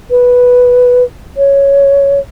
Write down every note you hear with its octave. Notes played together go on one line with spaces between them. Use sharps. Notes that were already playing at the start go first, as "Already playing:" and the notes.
B4
C#5